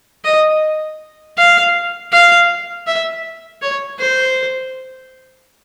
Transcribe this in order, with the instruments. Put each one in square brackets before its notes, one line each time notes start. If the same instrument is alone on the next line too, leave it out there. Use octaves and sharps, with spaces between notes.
[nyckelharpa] D#5
F5
F5
E5
C#5
C5